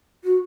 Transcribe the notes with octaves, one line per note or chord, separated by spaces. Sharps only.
F#4